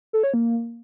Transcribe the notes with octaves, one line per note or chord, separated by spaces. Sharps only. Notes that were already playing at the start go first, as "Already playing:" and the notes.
A4
C#5
A#3